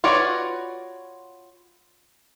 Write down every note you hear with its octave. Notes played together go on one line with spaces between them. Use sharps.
F4 F#4 B4 C#5 D5